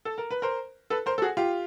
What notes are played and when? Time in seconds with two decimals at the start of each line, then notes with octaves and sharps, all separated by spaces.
0.05 A4
0.18 A#4
0.31 B4
0.42 A#4 C5
0.90 A4 B4
1.06 A#4 C5
1.18 A4
1.22 F#4 G#4
1.37 F4 G4